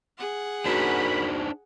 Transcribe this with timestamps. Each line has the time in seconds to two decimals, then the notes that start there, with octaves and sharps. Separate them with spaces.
0.18 G#4 F#5
0.66 F#2 D4 D#4 F#4 A#4 C5 B5